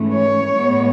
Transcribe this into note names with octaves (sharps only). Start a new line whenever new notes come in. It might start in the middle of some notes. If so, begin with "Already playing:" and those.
Already playing: G#2 E3 A3 C#4
C#5
A2 G#3 B3